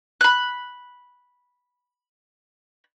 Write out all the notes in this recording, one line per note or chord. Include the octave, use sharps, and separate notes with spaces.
B5 F#6